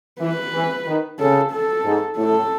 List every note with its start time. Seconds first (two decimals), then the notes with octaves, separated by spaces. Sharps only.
0.20 E3 B4
0.53 E3
0.86 D#3
1.19 C#3 A4
1.52 A4
1.85 G#2
2.17 A2 A4